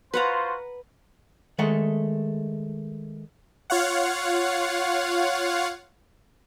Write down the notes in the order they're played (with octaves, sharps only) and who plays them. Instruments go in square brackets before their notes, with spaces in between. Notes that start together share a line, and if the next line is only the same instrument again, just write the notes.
[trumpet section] F4 F#4 C5 [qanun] B4 F#5 A#5
[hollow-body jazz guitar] D#3 G#3 A3 F#5
[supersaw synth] F4 C#5 F5 F#5